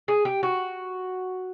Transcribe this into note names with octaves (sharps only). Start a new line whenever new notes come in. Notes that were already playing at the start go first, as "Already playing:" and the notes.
G#4
G4
F#4